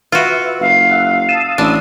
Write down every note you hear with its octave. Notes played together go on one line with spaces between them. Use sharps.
F4 F#4 B4 E5
F#1 F5
E5 F#5
A5 D#6 E6
A1 D4